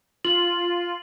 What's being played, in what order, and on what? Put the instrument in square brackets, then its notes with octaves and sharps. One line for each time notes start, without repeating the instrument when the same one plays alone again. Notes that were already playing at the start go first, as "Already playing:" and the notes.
[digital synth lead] F4 [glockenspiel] F#7